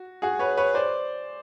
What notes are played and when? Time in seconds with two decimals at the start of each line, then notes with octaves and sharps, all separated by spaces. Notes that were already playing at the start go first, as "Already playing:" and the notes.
Already playing: F#4
0.22 F#4 G#4
0.39 B4 C#5
0.57 B4 C#5
0.75 C5 D5